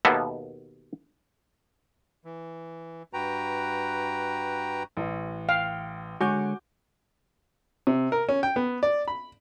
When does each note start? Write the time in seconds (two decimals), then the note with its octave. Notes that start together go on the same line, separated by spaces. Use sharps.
0.05 D#2 B2 A#3 B3 A4 E5
2.25 E3
3.13 G2 F#4 B4 G5 A#5
4.97 A1
5.49 F5 G5
6.21 D3 G#3 F#4 C#5 G#5 D6 G6
7.87 C3
8.12 A#4
8.29 C#4
8.43 G5
8.56 B3
8.83 D5
9.08 B5